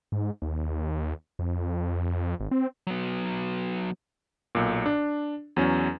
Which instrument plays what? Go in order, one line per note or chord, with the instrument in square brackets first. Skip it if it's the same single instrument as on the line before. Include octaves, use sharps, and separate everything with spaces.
[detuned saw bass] G#2
D#2
F2
G#1
C4
[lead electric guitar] F#3 B3
[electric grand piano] B1 A#2
D4
E2 F#3 C#4